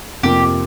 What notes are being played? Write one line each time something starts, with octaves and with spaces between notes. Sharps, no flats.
F2 C3 F3 A#3 G4